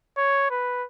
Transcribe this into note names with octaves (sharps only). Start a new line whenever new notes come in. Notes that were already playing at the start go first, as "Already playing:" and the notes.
C#5
B4